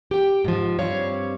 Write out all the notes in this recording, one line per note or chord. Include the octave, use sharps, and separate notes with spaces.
G4 G5
G#2 F3
G2 G3 C4 C#5 F5